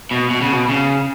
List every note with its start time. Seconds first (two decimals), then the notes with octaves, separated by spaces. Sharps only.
0.11 B2
0.30 B2
0.41 C#3
0.52 B2
0.69 C#3